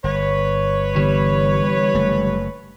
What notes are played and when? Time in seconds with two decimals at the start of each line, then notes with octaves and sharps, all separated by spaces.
0.04 G1 B4 C#5
0.96 D3 E3 G3 B3
1.94 F#1 A3